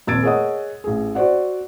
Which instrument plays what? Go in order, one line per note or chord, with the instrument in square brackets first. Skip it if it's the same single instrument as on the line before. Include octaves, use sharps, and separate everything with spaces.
[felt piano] D#1 F2 E6 G#6 A6 D7
G#4 A#4 C#5 D#5 F#5 D#6
A1 G#4
F#4 C5 D5 F#5